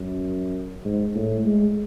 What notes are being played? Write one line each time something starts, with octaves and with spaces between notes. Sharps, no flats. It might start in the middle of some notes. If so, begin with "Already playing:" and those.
Already playing: F#2
G#2
A2
G#3